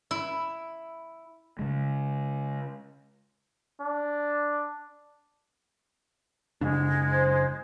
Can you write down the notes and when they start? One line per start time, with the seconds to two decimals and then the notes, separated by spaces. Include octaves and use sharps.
0.11 E4
1.59 C#3 G#3
3.80 D4
6.61 F#2 C#3 G#3 D4
7.12 C5